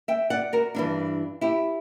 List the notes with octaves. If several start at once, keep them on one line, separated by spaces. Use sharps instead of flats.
E5 G5
D5 F#5
F#4 A#4
G2 E3 A#3 D4
E4 G4